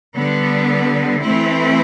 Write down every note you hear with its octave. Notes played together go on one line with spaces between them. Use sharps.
D3 G3 B3
E3 A3 C4 E4